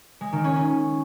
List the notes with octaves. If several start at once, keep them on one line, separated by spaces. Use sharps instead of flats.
G#3
D#3
C#4
C#4